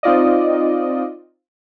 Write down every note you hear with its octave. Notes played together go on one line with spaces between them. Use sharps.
C4 D#4 F4 D5 D#5